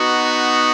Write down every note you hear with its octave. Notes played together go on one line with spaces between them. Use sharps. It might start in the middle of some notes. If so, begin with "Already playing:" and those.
Already playing: B3 D#4 F#4